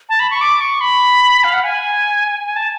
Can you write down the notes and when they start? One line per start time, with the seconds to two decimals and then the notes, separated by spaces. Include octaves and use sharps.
0.09 A5
0.20 B5
0.31 C#6
0.41 D6
0.61 C#6
0.81 B5
1.44 F5
1.53 F#5
1.64 G#5
2.45 G#5
2.56 A5